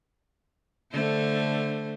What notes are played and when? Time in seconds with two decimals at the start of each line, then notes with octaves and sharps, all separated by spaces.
0.92 D3 A3 C5